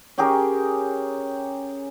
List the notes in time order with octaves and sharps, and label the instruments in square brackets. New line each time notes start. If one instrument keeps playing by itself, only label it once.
[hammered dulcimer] C#4 G4 G#4 A#4